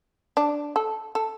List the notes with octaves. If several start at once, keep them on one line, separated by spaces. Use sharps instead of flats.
D4
A4
A4